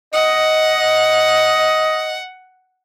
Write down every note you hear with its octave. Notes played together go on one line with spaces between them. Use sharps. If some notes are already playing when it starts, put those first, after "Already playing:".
D#5 F#5